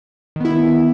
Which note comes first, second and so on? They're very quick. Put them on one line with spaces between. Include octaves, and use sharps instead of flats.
D#3 B3 E4